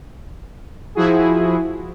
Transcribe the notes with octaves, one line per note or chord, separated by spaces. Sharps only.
F3 E4 F#4 G#4